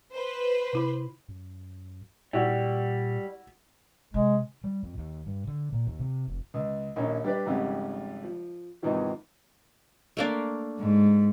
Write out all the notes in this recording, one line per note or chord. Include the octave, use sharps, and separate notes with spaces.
B4 C5
C3 E4 B5
F#2
A#2 G3 E4 F#4
C3 G#3
G3
F2
D#2
G2
D3
A#2
D#2
C3
F1
C#2
A#1 D#2 A#3 C#4
G3 D4 B4 D5
G#1 F2 C#3 G3 F#5
F3
E2 G#2 C3 D#3 F3
A3 A#3 D4
G#2